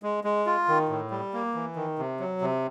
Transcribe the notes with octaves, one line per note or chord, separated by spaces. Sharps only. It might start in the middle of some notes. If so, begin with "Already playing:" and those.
G#3
G#3
F4
D#3
A2
G3
A#3
E3
D#3
C3
F#3
C3